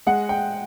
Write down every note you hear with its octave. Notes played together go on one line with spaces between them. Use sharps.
G#3 F#5
G5